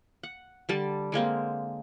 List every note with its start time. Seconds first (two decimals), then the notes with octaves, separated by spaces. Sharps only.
0.23 F#5
0.69 D3 G3 A5
1.12 D3 G#3 A#3 C4